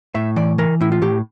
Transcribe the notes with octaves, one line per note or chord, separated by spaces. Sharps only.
A2 E5
E3 D5
E3 A#4
A2 E4
F4
A2 G4